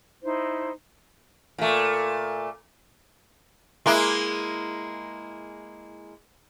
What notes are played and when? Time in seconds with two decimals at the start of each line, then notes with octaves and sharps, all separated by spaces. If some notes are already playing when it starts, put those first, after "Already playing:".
0.23 D#4 E4 C5
1.58 A#2 A3
3.86 G#3 A#3 E4